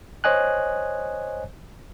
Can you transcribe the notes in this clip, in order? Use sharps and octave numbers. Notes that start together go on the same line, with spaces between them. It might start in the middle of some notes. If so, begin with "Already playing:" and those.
C5 C#5 D#5 G#5 F#6